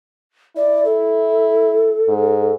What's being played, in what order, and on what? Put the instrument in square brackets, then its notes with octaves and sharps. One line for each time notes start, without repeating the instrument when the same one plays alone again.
[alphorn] E4 [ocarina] D5
[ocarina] A4
[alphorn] G#2